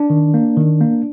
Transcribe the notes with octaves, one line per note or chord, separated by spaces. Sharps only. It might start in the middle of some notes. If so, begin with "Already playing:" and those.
Already playing: D4
D#3
A#3
D#3
A#3